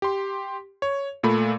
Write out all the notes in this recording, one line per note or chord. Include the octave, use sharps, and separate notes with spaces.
G4 C6
C#5
A#2 A3 B5